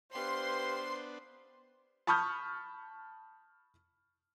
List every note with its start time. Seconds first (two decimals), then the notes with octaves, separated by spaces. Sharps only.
0.15 B3 D4 G4 B4 C5 F5 C6
2.07 A5 B5 C#6 D#6 F6 G6